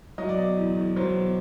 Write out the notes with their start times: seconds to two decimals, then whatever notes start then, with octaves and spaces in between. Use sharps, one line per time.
0.18 F#3 D#5
0.29 D5
0.38 B2 D#5
0.57 E2
0.77 E2
0.96 F#3 C5
1.16 B2